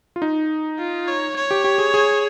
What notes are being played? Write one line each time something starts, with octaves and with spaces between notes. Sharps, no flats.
F4
D#4
F4
C#5
C#5
G4
G4
G#4
G#4